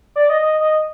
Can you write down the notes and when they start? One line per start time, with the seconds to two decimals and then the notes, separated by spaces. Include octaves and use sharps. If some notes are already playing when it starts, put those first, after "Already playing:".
0.16 D5
0.29 D#5
0.42 D#5
0.60 D#5